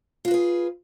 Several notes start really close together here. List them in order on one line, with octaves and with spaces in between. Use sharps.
F4 F#4 B4 G#4